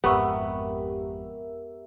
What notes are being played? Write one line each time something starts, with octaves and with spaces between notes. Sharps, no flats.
G#1 F2 B3 G4 A#4 E5 B5 C#6